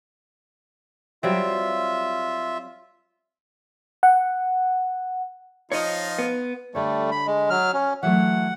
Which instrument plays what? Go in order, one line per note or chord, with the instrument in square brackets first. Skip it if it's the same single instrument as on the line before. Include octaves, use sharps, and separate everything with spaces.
[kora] F#3 G3 C4 [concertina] F4 E5
[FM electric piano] F#5
[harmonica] F3 D#4 F4 [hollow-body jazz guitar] C#5 D#5
[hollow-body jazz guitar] B3
[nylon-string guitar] D3 C#5 [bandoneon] G3 A3
[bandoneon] B5
G#3
F#3 F6
C#4
[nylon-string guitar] E3 F#3 A3 [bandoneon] F#5